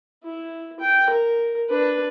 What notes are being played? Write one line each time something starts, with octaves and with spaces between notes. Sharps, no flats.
E4
G5
A#4
D4 B4